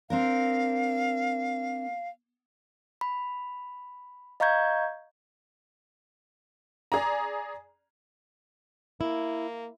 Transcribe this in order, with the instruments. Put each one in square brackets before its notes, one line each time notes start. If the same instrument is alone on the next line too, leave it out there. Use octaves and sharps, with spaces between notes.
[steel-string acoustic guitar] C4 D4 A#4 [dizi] F5
[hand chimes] B5
D#5 F5 A#5 C#6 G6 G#6
[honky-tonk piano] G#4 D5 A#5
[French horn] A#3 [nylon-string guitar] E4